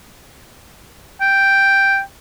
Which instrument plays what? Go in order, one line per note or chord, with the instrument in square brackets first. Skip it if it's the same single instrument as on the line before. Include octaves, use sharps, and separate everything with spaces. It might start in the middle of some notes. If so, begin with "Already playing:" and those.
[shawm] G5